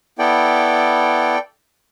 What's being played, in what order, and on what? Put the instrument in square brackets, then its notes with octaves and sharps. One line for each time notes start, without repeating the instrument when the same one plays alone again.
[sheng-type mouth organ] B3 E4 A4 D5 G5